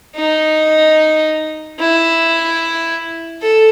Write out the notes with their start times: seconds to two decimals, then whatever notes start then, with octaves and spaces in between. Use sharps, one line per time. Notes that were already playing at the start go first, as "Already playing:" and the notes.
0.16 D#4
1.79 E4
3.41 A4